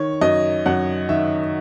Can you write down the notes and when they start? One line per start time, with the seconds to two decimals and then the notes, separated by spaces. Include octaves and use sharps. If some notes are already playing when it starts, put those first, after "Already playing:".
Already playing: D#3 C#5
0.21 F#2 D#5
0.66 F#2 F#5
1.09 D#3 E5